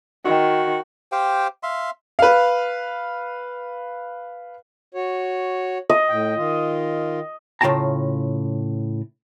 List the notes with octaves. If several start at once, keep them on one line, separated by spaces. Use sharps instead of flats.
D#3 F#4
G4 C5 F5 G5
E5 F5 C6
B4 F5
F#4 C#5
D#5
A2 G5
D#3 F4
A2 C#3 F4 G5 A5 A#5